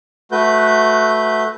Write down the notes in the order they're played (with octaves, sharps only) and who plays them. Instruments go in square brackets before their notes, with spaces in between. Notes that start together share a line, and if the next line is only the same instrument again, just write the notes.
[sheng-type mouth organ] A3 F#4 B4 G6